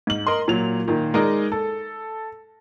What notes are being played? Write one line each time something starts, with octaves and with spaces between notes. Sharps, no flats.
G#2 F#7
A#4 D#5 C6
A#2 F#3 F7
A#2 D#3
G#3 D#4 A#4 D5 D#5
A4